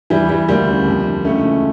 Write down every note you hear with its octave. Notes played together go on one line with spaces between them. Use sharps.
E2 E3 G3
E3 G3
D2 G3 A#3
C#3 E3
F2
D3
C#2 A3 C#4
C#3 E3